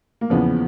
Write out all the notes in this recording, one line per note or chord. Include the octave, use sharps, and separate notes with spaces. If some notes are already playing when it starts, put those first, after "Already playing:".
A#3
E2 C#3 F3 B3